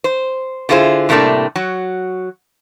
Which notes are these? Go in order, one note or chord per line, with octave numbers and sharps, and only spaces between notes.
C5
D3 E4 F4 G#4 C5
A2 C3 G3 A3 A#3 D4
F#3 F#4